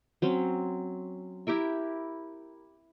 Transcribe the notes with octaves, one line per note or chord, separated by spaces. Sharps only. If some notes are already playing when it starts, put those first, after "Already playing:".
F#3 C4 C#4
E4 G4 A#4 E5